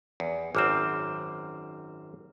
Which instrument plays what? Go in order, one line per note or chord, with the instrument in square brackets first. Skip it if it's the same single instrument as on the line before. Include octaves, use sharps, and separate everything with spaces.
[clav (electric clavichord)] E2
[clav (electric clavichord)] G#1 F#2 C4 [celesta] D6 F6 E7